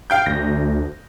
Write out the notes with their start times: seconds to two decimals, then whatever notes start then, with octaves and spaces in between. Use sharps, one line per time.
0.10 F5 G5 G6
0.26 D2 A#6